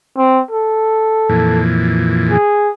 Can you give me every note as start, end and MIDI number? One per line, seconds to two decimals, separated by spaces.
0.18 0.40 60
0.51 1.63 69
1.29 2.37 41
1.29 2.37 46
1.29 2.37 52
2.30 2.70 68